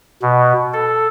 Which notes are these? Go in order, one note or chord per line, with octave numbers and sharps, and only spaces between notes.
B2
A4